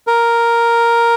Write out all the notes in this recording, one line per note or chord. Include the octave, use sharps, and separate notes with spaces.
A#4